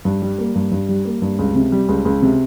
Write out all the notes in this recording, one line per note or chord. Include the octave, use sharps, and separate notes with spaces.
G2
G3
A#3
G2
G2
G3
A#3
G2
C#2
C3
G3
C#2
C#2
C3